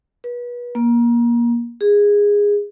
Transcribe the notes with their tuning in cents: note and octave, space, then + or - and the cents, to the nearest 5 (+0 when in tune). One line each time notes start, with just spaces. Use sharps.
B4 -30
A#3 +25
G#4 -15